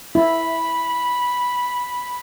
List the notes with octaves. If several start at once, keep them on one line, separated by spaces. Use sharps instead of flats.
E4 B5